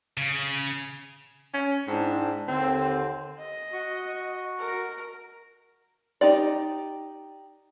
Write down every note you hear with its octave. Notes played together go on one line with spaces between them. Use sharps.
C#3
C#4
G#2 C4 D4 E4
D#2 D3 C4
D#5
F#4 C#6
A#4
D#4 G4 D5